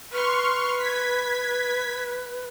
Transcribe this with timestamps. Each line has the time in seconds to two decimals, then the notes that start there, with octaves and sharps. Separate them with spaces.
0.13 B4 C6 C#6 F6
0.78 G#6 B6